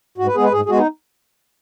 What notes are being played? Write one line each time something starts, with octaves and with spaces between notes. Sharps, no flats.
G#2 F#4
B4
G#3 B3 G#4
B4
G#2 G#4
G#4
G#3 B3 F#4
D#4